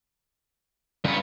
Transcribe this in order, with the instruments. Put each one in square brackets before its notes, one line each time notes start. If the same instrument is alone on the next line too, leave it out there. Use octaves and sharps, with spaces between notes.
[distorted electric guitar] G2 B3 [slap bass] C#3 C#4